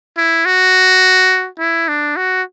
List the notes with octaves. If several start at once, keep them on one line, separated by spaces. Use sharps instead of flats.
E4
F#4
E4
D4
F#4